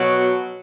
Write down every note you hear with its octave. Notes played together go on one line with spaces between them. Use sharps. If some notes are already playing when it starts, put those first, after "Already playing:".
Already playing: B2 F#3